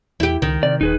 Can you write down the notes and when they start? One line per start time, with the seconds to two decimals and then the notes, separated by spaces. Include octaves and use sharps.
0.20 E2 E4 G4
0.42 C#2 D#3
0.63 C3 D5
0.81 D#1 D#4 G#4 B4